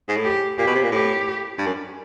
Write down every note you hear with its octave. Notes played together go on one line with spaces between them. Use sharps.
G#2
A2
G4
A#2 G4
B2
C3
A#2
A2 G4
G2
F#2